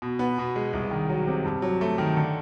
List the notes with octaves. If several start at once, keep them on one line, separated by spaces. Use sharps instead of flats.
B2
B3
B2
G#3
C2
D#3
F#3
C3
G2
F#3
A3
D#3
D3